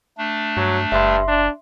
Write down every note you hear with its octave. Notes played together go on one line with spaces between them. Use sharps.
A3 D4
G2 F#3
F#1 G2 E5 C6
D4